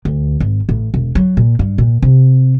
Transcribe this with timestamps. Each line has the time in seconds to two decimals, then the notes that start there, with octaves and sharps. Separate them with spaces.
0.05 D2
0.40 G#1
0.69 A1
0.94 E1
1.15 F#3
1.37 A#2
1.59 G2
1.78 A#2
2.02 C3